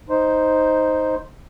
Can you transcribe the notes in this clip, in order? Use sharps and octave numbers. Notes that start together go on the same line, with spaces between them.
D#4 C5